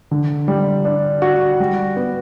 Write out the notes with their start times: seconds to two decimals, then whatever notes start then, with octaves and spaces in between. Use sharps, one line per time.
0.11 D3
0.48 G3
0.85 D4
1.22 F#4
1.60 G3
1.96 B3